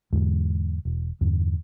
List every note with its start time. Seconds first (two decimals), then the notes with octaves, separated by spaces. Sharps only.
0.13 E2 G#2 D3 G#3
0.85 E1
1.21 E2 G2 D3